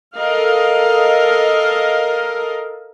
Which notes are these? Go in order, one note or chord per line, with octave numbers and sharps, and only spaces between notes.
A4 A#4 D#5 F5